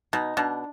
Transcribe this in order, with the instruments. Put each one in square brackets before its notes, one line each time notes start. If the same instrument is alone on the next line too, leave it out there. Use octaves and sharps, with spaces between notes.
[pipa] B2 [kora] D#4
[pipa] B2 [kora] D4